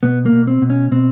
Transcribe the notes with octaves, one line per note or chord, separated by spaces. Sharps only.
B2 B3
A#3
B2
C4
B2
C#4
B2 C4